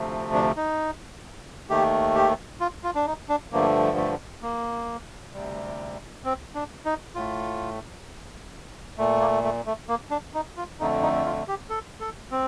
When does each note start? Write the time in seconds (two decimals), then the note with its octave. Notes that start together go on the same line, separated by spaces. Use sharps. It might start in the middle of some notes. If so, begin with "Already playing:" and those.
Already playing: D2 C3 F3 A3
0.34 D4
0.57 D#4
1.70 D#2 D#3 A3 G4
2.15 G4
2.61 F4
2.84 F4
2.95 D4
3.07 D#4
3.29 D4
3.52 G2 D3 F3 A3 A#3
3.97 A3
4.42 A#3
5.34 D2 C3 G3
6.24 C4
6.55 D4
6.85 D#4
7.15 A2 A3 F4
8.98 A#2 A3
9.20 A#3
9.43 A3
9.66 A3
9.88 A#3
10.11 D4
10.34 D#4
10.57 F4
10.79 F2 D3 A3 D#4
11.02 D#4
11.25 F4
11.48 G4
11.70 A4
12.01 A4
12.31 C4